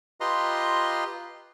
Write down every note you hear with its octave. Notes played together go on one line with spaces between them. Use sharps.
F4 G4 B4 D#5 A#5 C6